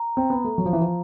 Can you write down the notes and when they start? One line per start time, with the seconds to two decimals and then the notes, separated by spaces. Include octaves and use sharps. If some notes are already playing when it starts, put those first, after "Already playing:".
Already playing: A#5
0.17 C4
0.30 B3
0.44 A3
0.58 F#3
0.66 F3
0.73 E3
0.81 F3